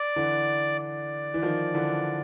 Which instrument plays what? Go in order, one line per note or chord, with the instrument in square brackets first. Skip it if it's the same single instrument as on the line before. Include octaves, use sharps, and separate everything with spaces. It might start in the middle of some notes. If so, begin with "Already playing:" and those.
Already playing: [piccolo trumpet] D5
[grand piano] D3 E3
[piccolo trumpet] D5
[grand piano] E3
D#3 F3
D3 E3